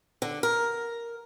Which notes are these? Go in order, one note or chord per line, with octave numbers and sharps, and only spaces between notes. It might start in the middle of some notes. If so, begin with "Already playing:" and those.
D3
A#4